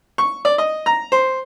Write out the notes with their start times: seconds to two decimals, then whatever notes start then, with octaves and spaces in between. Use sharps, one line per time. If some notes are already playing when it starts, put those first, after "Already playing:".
0.18 C#6
0.45 D5
0.58 D#5
0.86 A#5
1.12 C5